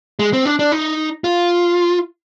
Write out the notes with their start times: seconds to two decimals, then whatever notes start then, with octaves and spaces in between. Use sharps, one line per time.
0.19 G#3
0.33 C4
0.46 D4
0.59 D4
0.72 D#4
1.24 F4